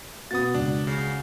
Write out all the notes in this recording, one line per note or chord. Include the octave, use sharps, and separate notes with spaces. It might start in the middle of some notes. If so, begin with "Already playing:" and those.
B2 B3 F#4 F#5 A5 D#6 A6
C#2 D4
C#3